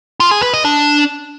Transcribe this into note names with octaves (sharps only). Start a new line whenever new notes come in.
F4
G#4
B4
D#5
D4